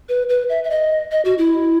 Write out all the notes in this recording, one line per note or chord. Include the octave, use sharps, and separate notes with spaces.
B4
B4
E5
E5
D#5
D#5
F#4
E4